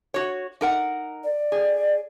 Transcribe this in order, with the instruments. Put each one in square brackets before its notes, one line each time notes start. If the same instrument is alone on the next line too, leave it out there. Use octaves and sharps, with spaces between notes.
[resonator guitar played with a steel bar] F#4 C#5
D#4 A#4 F#5
[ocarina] D5
[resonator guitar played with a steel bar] G#4